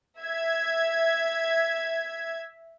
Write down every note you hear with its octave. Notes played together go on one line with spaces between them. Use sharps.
E5 G#6